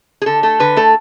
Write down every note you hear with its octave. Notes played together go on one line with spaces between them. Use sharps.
G#4
D3 A4
A3 A4
D3 B4
A3 A4